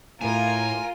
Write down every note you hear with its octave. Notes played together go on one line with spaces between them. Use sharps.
A2 F4 A#4 G#5